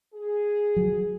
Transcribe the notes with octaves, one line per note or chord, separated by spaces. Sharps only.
G#4
F#3